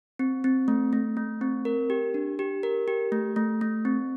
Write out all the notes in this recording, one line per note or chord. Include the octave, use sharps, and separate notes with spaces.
C4
C4
A3
A3
A3
C4
A#4
G4
D4
G4
A#4
G4
A3
A3
A3
C4